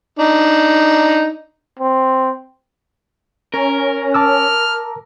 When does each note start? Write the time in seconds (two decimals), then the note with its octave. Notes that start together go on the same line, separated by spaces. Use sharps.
0.19 D4 D#4
1.79 C4
3.54 C#4 A#4
4.14 A5 D6 E6 F6